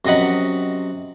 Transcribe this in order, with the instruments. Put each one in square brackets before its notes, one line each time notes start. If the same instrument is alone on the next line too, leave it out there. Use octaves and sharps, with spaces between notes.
[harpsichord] F#2 C3 D#5 F#5 B5